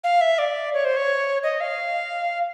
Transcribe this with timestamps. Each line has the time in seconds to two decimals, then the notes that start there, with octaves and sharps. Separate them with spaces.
0.04 F5
0.21 E5
0.39 D5
0.74 C#5
0.85 C5
0.97 C#5
1.43 D#5
1.61 F5